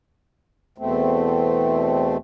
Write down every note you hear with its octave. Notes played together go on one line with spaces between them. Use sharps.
E2 B2 A3 C4